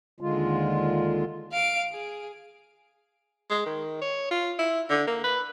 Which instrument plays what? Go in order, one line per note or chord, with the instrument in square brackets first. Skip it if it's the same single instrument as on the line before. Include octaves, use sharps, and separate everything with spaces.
[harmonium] D#2 D3 G#3 F4
[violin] F5 D7
G#4
[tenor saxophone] G#3
D#3
C#5
F4
E4
D3
A#3
B4